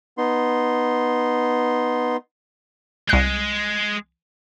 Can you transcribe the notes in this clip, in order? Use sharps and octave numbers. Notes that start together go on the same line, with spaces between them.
B3 D#4 C6
C2 G#3 F#6